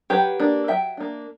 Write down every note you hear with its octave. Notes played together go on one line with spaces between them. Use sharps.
F#3 G4 B4
A#3 D4
F#3 E5 G5
A#3 D4